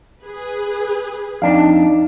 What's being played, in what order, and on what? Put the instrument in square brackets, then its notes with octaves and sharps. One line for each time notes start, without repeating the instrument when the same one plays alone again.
[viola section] G#4 B4
[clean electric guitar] F2 D4 [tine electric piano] D#4 F5